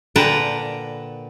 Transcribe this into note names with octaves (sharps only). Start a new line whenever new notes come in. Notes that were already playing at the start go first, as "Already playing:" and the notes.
A#2 D3 B4 G5 A5 A#5